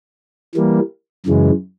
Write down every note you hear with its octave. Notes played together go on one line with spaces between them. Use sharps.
E3 G3 A#3
F#2 C#3 E3 G#3